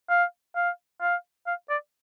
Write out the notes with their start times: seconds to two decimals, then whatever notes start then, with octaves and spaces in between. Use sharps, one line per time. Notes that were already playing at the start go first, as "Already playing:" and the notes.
0.10 F5
0.56 F5
1.01 F5
1.47 F5
1.70 D5